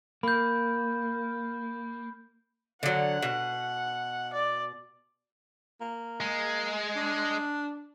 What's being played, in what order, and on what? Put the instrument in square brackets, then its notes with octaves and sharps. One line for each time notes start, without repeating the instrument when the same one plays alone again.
[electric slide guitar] A#3 [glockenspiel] B5 G6
[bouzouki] D3 F#3 [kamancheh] F#5
[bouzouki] B2
[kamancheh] D5
[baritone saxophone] A#3
[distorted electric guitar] G#3
[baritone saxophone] D4